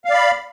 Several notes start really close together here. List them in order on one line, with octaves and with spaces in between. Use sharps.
F5 D5 B5